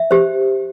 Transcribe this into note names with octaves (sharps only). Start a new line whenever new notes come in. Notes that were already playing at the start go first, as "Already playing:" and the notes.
Already playing: E5
G4 C5